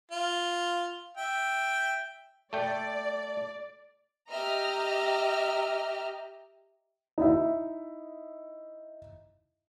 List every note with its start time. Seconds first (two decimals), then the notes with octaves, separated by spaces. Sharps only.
0.11 F4
1.17 E5 G5
2.53 A3 D5 G5
4.30 G4 D#5 E5 A#5 F6
7.18 D#4 E4 D#5 E5